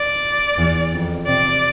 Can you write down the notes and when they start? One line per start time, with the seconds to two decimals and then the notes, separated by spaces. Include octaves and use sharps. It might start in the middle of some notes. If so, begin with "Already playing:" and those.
Already playing: D5
0.58 E2
0.93 F2
1.27 C3 D5